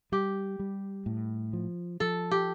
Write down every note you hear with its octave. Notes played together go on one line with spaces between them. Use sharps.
G3 G4
G3
A2
F3
F3 A4
G4